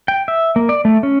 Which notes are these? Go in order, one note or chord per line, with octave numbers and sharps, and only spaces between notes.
G5
E5
A#3
D5
A3
C#4